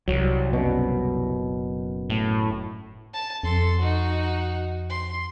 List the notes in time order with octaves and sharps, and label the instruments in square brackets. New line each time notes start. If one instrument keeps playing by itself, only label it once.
[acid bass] C2 [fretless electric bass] F#3
[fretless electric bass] F#1 F#2 B2
[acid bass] A2
[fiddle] A5
[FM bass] F2 [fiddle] A4 C6
[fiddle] D#4 F#4
C6